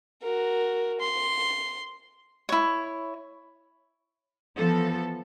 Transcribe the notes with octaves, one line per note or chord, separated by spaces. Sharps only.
F#4 A#4
C6
E4 C#5
E3 F3 B3 A4